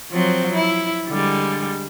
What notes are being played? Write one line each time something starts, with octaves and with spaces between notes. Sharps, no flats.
F3 F#3 C4
E4
D3 G3 G#3